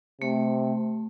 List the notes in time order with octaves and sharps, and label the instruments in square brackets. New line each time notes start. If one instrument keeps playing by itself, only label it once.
[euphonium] C3 [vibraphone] A3